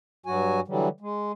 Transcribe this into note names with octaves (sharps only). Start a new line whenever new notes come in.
G2 F#3 F#4 G#5
D3 E3 F#3 G3
G#3